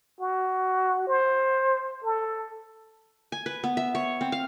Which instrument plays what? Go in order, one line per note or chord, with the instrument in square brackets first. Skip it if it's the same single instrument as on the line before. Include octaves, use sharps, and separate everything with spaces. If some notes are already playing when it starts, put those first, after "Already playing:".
[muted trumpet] F#4
C5
A4
[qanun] G#5
B4
B3
E5
C#5
C4
F5